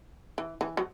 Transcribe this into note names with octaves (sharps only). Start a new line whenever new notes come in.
E3
E3
F#3